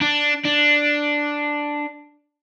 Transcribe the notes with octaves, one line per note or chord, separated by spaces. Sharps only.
D4
D4